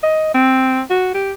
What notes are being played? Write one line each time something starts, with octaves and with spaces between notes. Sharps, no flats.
D#5
C4
F#4
G4